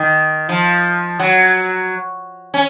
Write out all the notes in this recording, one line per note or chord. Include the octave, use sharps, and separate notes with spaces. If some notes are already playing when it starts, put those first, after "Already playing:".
Already playing: D#3
F3
F#3
C#4